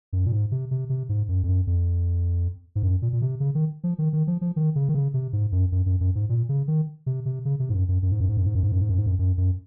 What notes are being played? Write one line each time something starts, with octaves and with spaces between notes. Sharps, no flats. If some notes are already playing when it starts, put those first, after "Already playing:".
F#2
A#2
G#2
C3
C3
C3
G#2
F#2
F2
F#2
F2
G#2
F#2
A#2
A#2
C3
C#3
D#3
F3
D#3
D#3
F3
F3
D#3
C#3
D#3
C#3
C3
G#2
F#2
F#2
F#2
F#2
G#2
A#2
C#3
D#3
C3
C3
C#3
C3
G#2
F#2
F#2
F#2
G#2
F#2
G#2
F#2
G#2
F#2
G#2
F#2
G#2
F#2
G#2
F#2
F#2
F#2